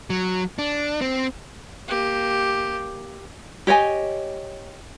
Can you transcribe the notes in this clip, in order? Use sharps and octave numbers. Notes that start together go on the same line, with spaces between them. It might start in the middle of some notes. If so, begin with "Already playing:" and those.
F#3
D4
C4
A#3 G4
G4 C#5 D#5 G#5